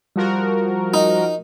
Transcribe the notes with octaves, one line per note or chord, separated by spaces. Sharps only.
F3 G3 F#4 A#4
D#4